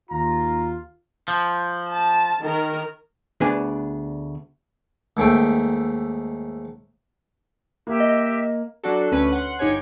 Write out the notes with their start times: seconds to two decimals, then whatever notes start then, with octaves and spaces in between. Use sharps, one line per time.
0.10 D#2 F4 A#5
1.28 F3
1.88 A5
2.41 D#3 A#4
3.41 D2 B3 D4 G#4 G#5
5.17 D#2 G#2 A3 G5
7.87 A#3 G4 E5
8.00 D#5
8.84 F#3 D4 F#4 A4
9.12 D2 C#4 B4
9.32 F#5 C6
9.59 G1 D#4 G4 C#5 G#5